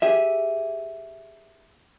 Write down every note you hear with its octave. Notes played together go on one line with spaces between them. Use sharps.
G4 G#4 E5